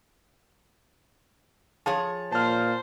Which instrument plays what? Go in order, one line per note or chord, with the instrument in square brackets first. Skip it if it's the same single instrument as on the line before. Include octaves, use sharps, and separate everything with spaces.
[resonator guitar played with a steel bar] F3 G#4 C#5 [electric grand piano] A5
[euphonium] A#2 [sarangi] C5 [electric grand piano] A5 F6